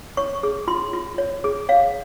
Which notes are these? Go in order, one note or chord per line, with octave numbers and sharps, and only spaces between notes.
C#5 C#6
G#4
F4 C6
F4
C#5
G#4
C#5 F5